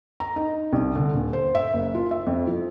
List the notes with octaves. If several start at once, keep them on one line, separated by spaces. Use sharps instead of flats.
A#5
D#4
C2
D3
D#1
C5
E5
F#1
F4
E5
F2
F3